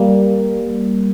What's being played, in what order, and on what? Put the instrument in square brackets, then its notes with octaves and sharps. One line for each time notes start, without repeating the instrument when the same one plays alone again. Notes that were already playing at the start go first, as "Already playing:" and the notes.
Already playing: [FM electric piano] G3 A#3